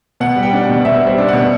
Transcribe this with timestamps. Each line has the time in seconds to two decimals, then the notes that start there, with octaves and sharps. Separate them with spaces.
0.20 B2 F#5
0.36 G3
0.43 G5
0.53 D4
0.64 F#5
0.69 B2
0.85 B2 E5
1.02 G3 C5
1.18 D4
1.28 B2 F#5